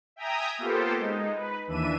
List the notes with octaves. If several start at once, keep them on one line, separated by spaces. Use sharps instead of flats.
E5 G5 G#5 A#5 D#6
A#3 B3 F4 G4 A4 C5
G#3 D#4
B4
D#2 E3 D4 E5 D#7